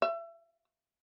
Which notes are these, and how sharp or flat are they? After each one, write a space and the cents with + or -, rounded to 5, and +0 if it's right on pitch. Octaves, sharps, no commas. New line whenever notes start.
E5 +30